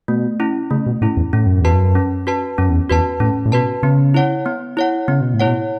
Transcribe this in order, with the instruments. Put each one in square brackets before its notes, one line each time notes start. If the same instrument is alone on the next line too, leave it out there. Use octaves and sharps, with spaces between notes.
[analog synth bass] B2 [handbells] A3
[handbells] C#4 E4
[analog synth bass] C#3 [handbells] A3
[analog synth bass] B2
[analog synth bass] A2 [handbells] C#4 E4
[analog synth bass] E2
[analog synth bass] A2 [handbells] C#4
[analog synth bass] F#2
[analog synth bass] E2 [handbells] F#4 B4 A5
[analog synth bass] F#2
[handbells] C#4
F#4 B4 A5
[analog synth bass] F#2 [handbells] C#4
[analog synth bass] E2
[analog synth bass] E2 [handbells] F#4 B4 A5
[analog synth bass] A2 [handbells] C#4
[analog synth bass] A2
[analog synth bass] B2 [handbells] F#4 B4 A5
[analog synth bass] C#3 [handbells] B3
[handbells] E4 C#5 F#5
B3
E4 C#5 F#5
[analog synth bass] C#3 [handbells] B3
[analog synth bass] B2
A2
[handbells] E4 C#5 F#5
[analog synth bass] B2